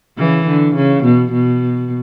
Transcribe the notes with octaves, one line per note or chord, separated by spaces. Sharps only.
C#3 E3
D3
C#3
B2
B2